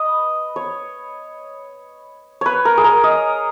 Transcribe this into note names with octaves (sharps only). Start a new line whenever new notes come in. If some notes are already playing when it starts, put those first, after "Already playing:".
Already playing: B4 D#5
C#5
B4 C#5
A#4
G#4
A#4
D#5